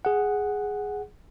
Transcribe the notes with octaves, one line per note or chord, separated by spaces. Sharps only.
G#4 F#5